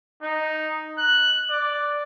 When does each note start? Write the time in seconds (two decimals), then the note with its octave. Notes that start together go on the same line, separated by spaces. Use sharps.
0.23 D#4
0.98 F#6
1.50 D5